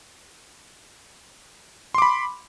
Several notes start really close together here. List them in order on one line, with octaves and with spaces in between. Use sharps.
C6 D6 B5